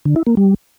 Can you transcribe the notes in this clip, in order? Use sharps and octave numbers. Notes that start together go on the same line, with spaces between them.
D3
E4
A#3
G3